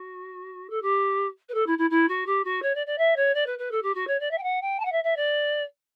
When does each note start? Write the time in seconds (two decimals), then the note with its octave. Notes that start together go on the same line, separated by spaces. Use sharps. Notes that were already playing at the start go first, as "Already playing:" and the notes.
Already playing: F#4
0.70 A4
0.82 G4
1.49 B4
1.54 A4
1.66 E4
1.78 E4
1.90 E4
2.08 F#4
2.26 G4
2.44 F#4
2.62 C#5
2.75 D5
2.86 D5
2.98 E5
3.16 C#5
3.34 D5
3.46 B4
3.58 B4
3.71 A4
3.82 G4
3.94 F#4
4.07 C#5
4.20 D5
4.31 E5
4.38 G5
4.43 F#5
4.61 G5
4.79 A5
4.85 F#5
4.92 E5
5.03 E5
5.16 D5